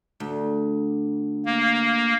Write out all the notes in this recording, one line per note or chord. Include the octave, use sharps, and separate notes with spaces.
D2
A#3